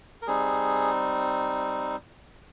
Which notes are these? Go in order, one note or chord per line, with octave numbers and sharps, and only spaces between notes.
A#4
G3 C4 D#4 G#4